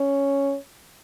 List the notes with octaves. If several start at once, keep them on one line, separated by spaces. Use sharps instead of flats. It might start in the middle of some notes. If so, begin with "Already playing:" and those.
Already playing: C#4